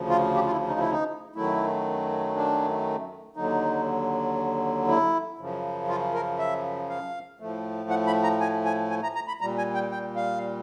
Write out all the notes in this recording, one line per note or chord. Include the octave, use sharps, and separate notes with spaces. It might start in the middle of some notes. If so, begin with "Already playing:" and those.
Already playing: D2 C#3 F3
F4
G4
F4
E4
D#4
E4
D#4
F#2 D#3 F#3 A3 E4
D4
D#2 D3 F#3 D#4
E4
F#2 C#3 F3
F4
A#4
E5
F5
A2 F3 A3
F#5
B5
A#5
G#5
G#5
G#5
A#5
A#5
B5
A#2 G3 A#5
G#5
G5
G5
F5